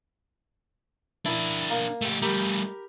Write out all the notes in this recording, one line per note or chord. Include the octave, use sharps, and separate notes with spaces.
D4 E4 A#4
A#3
A3 G4
G3 A3 G4 A#4 B5